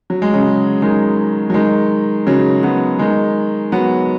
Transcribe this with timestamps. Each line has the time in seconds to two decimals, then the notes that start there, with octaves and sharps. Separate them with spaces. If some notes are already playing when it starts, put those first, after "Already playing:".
0.10 F#3
0.22 G#3
0.33 C#3 F#3
0.82 D#3 G#3
1.50 F#3
1.54 D#3 G#3
2.27 C#3 F#3
2.63 F#3 B3
2.99 D#3 G#3
3.72 F#3 B3